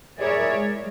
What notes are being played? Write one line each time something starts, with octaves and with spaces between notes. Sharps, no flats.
E4 G#4 A#4 C#5 D5 E5
G#3